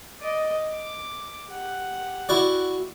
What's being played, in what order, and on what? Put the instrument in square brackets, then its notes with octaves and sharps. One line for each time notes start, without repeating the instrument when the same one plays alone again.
[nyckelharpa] D5 D#5
D6
G4 F#5
[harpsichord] E4 F#4 D5